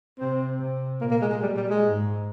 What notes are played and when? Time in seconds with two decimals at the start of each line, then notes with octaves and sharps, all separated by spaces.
0.19 C3 C4
0.60 C3
1.01 A#2 A#3
1.11 A#3
1.21 G#3
1.32 G#3
1.42 A#2 G3
1.57 G3
1.70 G#3
1.84 G#2